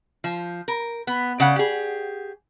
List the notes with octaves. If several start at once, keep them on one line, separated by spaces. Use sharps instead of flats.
F3
A#4
B3
C#3 D5 F#5
G4 G#4